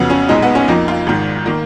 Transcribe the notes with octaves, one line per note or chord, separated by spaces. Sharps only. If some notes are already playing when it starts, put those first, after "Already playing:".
Already playing: F2 C#3 F#3 B3
C#4
B1 A#2 G#3 D#4
B3
C#4
F2 F3 A#3 D#4
F4
G#1 G#2 D#3
D#3 A#3